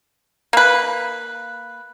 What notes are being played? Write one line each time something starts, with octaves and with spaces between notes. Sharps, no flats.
A#3 B4